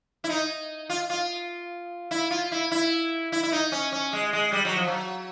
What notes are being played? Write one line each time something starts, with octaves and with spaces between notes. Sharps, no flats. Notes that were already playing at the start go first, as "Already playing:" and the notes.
E4
D#4
F4
F4
E4
F4
E4
E4
E4
E4
D#4
C#4
C#4
G#3
G#3
G3
F#3
F3
F#3